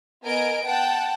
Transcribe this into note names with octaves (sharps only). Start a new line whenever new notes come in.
B3 A#4 D#5 G#5 D7
F#5 G5 A5